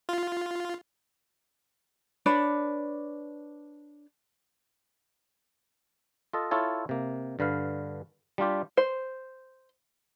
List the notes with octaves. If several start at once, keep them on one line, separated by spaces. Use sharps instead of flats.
F4
D4 B4 C#5
F4 A4 D#5
E4 F4 A4 C#5
C3 A#3
G2 D3 B4 F5
G3 D4 F4 G4
C5